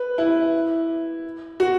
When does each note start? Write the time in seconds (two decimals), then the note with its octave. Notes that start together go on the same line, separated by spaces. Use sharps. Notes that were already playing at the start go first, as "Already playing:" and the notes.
Already playing: B4
0.18 E4
1.60 F#4